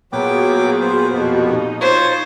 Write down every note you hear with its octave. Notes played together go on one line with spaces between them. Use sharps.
A#2 F#3 B3 F#4 G#4 G5 D6
C5
F2 B2 F#4 G4
D#4
F4 C5 C#5 C#6